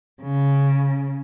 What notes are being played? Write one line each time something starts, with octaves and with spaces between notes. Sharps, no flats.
C#3